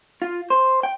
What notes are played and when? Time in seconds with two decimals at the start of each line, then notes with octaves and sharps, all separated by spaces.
0.22 F4
0.50 C5
0.83 G5